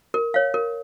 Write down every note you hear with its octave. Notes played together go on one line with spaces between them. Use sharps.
A#4
C#5 F5
A#4